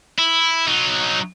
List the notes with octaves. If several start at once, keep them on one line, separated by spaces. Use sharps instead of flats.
E4
F#3 D#4